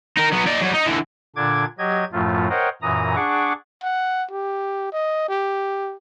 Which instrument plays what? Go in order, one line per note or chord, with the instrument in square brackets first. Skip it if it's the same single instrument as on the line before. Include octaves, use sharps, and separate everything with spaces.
[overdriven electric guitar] D#4 A#4
F#3 B3
D#4 D5
F#3 G3
D#4
D3 E3
[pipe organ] A#2 D3 D4 D6 G#6
F#3 G4 D#5 G#6
F#2 A2 F3 A3 F4
A#4 C5 C#5 D#5 F#5 G5
F#2 A#2 E3 A#5 D#6
D4 G#4 F#5 C#6 D6
[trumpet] F#5
G4
D#5
G4